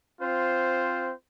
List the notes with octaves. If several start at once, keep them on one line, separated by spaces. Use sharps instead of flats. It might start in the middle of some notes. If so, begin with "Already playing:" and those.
C4 F4 C5